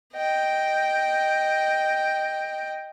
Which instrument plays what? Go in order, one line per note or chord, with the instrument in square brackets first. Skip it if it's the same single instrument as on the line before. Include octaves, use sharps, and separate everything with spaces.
[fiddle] D#5 G5